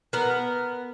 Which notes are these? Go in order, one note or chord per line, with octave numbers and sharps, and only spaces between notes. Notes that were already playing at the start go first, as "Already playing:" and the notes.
B3 A#4